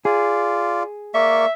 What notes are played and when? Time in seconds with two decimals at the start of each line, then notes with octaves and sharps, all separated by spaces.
0.05 F4 G#4 D5
1.14 A#3 D5 E5 C#6